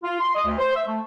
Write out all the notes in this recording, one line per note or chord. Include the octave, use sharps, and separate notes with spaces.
F4
C6
D#5
D2
C5
E5
A3